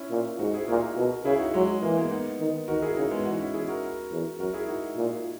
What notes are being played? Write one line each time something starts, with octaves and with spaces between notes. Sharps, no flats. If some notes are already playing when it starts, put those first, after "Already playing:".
Already playing: C#4 E4
A#2
G#2 D#4 F#4
E4 G#4
A#2 F#4 A#4
B2
C#3 E4 G#4
D#4 F#4
F#3 G#3
E3 A#3
G#3 B3
B3 D#4
D#3
D#3 F#4 A#4
E4 G#4
C#3 D#4 F#4
G#3 B3
E2 D#4 F#4
C#4 E4
E2 E4 G#4
F#4 A#4
E2
F#2 F#4 A#4
E4 G#4
D#4 F#4
A#2